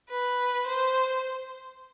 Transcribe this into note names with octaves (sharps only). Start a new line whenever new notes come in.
B4
C5